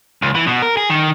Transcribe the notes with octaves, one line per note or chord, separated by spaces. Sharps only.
C#2
E3
B2
A#4
G#4
D#3